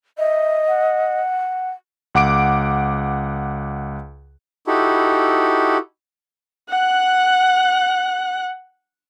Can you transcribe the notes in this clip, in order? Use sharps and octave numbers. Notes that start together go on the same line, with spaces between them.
D#5 E5
F#5
C#2 F#5 D6 D7
D#4 E4 F#4 G4 A4
F#5 F#6